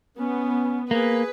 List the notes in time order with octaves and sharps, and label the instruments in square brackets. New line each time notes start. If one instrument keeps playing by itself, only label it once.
[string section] B3 [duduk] C#4
[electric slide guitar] A#3 [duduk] G#4 [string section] B4